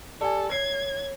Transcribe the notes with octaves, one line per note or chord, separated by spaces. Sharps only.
G4 A4 D5 G#5
C#5 G#6 C7